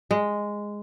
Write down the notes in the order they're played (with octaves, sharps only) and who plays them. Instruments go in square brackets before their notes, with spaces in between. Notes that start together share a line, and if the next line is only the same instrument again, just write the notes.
[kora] G#3